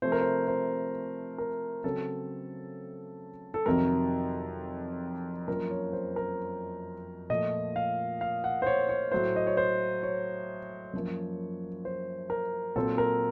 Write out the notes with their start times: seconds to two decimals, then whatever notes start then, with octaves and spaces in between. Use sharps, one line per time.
0.02 C3 F3 A3 C5
0.12 A#4
0.21 C5
0.48 C5
1.38 A#4
1.84 C#3 F#3 C4 A4
3.54 A4
3.66 F2 C3 D#3 F#3 A#4
5.48 F#2 F3 A#3 A#4
5.70 C#5
5.93 C5
6.16 A#4
7.30 A#2 F3 A3 D#5
7.76 F5
8.21 F5
8.44 F#5
8.62 C5
8.67 C#5
8.89 C#5
9.12 A2 F#3 A3 C5
9.36 D#5
9.47 C#5
9.57 C5
10.03 C#5
10.93 F#2 F3 A#3
11.85 C5
12.30 A#4
12.76 A#2 F#3 C4 A4
12.98 A#4